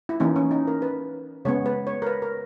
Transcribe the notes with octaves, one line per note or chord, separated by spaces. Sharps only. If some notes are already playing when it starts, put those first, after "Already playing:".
E4
E3 A#3 C#4 D#4
C#4
D#4
A#4
B4
C#3 G#3 B3 C#5
B4
C#5
A#4
B4
A#4